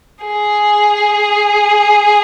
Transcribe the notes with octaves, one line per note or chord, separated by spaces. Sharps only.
G#4